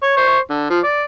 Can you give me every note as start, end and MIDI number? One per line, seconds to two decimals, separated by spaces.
0.03 0.16 73
0.17 0.38 72
0.17 0.38 85
0.50 0.69 50
0.70 0.79 53
0.84 1.03 74